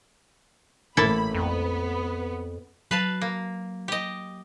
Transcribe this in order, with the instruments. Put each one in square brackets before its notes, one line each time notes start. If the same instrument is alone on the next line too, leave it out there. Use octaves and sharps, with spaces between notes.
[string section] A1 B5 [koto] A#3 E4 A4
[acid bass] F2 [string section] B3
[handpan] F#3 [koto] B4 F5 A5
[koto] A#3
G4 D#5